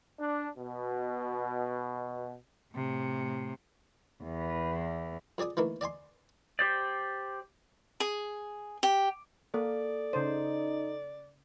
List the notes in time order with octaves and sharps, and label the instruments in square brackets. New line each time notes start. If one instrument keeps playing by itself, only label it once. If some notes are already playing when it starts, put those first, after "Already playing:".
[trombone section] D4
B2
[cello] A2 C3
[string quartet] E2
[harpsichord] F2 G#4 D5 G#5 D#6
D#3 E3 A3 A#3
D5 D#5 G#5 C6
[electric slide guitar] G4 C5 D5
[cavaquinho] G#4
G4
[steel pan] A#3 [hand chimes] A4 [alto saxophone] D5
[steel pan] C#3 C5 [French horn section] D#4